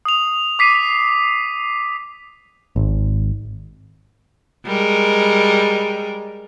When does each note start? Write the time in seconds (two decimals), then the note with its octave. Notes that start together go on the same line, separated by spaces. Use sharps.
0.05 D#6 F7
0.59 D6 B6 C7 D#7
2.76 G#1
4.66 G3 G#3 A#4